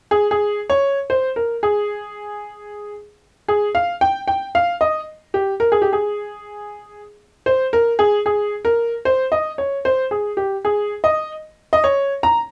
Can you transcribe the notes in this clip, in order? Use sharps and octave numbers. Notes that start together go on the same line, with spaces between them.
G#4
G#4
C#5
C5
A#4
G#4
G#4
F5
G5
G5
F5
D#5
G4
A#4
G#4
G4
G#4
C5
A#4
G#4
G#4
A#4
C5
D#5
C#5
C5
G#4
G4
G#4
D#5
D#5
C#5
A#5